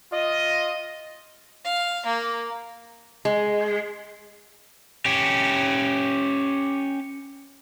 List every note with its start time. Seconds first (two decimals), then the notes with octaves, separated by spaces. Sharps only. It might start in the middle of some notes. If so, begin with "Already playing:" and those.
0.13 F4 D#5
1.65 F5
2.06 A#3
3.25 G#3
5.06 C#4 G4